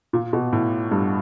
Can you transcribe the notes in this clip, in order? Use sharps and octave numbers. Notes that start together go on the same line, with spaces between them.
A#2
B2
A2
G2